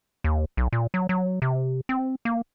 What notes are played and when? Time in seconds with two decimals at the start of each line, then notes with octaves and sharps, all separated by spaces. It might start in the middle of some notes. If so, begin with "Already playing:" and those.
0.24 D#2
0.57 B1
0.73 A#2
0.94 F#3
1.09 F#3
1.42 C3
1.89 C4
2.25 A#3